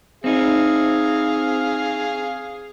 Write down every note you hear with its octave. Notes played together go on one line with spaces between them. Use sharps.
C4 D#4 E4 G#4 F5